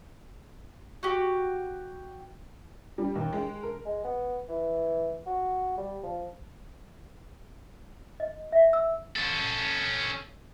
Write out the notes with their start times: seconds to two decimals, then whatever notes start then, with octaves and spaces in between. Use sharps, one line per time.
1.03 F#4 G4
2.98 G3
3.16 D#2
3.33 G#3
3.63 A#4
3.86 G#3
4.04 B3
4.48 E3
5.26 F#4
5.78 G3
6.03 F3
8.20 D#5
8.52 E5
8.73 E6
9.16 C#4 A4